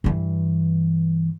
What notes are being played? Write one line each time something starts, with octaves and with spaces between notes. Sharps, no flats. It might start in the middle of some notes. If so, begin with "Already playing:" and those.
G2 E3